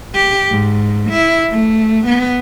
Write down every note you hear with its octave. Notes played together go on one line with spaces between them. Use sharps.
G4
G#2
E4
A3
B3